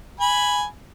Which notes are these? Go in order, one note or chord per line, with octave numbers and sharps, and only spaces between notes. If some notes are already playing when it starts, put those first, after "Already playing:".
G#5 B5